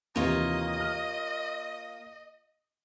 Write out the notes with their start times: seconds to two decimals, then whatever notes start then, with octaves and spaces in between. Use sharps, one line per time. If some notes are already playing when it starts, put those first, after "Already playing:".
0.16 D#2 C3 E3 A#3 F4 C#5 D#5
0.80 F6